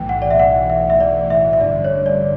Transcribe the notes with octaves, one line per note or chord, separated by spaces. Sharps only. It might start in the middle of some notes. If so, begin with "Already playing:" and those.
Already playing: B1 A2 E3 G5
F#5
D5
E5
F#5
E5
E5
D5
E5
E5
A1 G2 D3 D5
C#5
D5